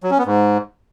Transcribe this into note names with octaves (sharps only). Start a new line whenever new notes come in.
F#3
C#4
B3
G#2